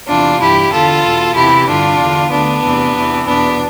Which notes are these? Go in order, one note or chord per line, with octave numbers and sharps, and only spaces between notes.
E2 C3 E3 D4 F4
G2 E3 E4 G4
E2 D3 F4 A4
E2 B2
E2 C3 E3 E4 G4
G2 D3 D4 F4
E2 D3
D2 D3 B3 D4
E2 C3 E3
E2 C3 E3
E2 B2 B3 D4